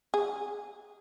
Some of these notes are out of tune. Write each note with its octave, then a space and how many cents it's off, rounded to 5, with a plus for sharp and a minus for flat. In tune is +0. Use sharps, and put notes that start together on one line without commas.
G#4 -10